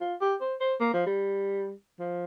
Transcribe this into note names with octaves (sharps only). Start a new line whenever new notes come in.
F4
G4
C5
C5
A#3
F3
G3
F3